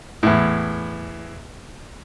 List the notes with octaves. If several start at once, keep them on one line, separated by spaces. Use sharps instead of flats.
E2 A2